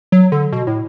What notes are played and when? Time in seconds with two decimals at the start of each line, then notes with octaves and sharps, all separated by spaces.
0.12 F#3
0.32 D3
0.52 B2
0.67 A2